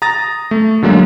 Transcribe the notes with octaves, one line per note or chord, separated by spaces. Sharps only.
A#5 D#6 A6 A#6
A3
D3 F#3 G#3 A#3